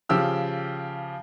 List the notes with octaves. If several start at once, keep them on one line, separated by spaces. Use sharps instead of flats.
C#3 F3 G4 E6